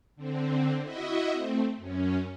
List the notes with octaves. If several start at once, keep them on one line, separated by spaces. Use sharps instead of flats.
D3 C4
E4 F#4 D#5 E5
A3 C4
F#2 C#4